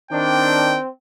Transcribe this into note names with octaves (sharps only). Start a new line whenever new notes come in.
D#3 C4 D4 G5